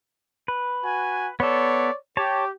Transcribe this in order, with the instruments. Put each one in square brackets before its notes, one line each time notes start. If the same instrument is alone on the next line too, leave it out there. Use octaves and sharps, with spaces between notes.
[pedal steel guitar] B4
[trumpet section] F#4 G#5
[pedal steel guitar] B3 A4 [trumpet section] C#5 D5
[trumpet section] G4 [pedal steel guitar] C#5 A5